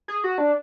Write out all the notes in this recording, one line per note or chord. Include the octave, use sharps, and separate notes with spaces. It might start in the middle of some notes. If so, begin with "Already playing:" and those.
G#4
F#4
D4